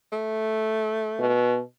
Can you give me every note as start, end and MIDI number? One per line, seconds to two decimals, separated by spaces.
0.12 1.38 57
1.19 1.61 47